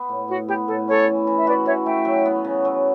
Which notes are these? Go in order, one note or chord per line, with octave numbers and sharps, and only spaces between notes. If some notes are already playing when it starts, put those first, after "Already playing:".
Already playing: B3
A2
A2 F#4
B3 G4
A2 A4
C#4 A4 C#5
E3
E3
E5
F#4 B4 D5
E3 C#5 E5
A3 E5 G5
F#3
B3
C#3
F#3